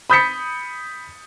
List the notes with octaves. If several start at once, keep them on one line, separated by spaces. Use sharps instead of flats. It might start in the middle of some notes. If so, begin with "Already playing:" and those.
B5 D#6 G6 A6 B6 C#7